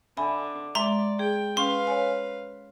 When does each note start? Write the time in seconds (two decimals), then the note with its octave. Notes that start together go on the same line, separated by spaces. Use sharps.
0.17 D3 E5 G#5 B5
0.75 G#3 D5 E5 A#5 C6
1.19 G#4 G5
1.57 C#4 B4 F5 C6
1.87 C#5 G#5